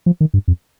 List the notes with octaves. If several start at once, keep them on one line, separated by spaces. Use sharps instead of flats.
F3
D#3
G2
F2